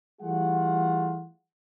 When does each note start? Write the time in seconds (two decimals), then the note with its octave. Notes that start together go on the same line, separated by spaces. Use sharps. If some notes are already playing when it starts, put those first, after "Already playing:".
0.21 E3 G3 A3 F4 G#4 F#5